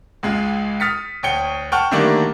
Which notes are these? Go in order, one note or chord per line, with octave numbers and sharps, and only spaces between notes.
C#2 G#3 F4
D#6 F6 A6 B6 C#7
D2 C#5 G5 C#7 G7
F#5 G5 A5 C#6 F6
D3 D#3 G3 A3 A#3 D4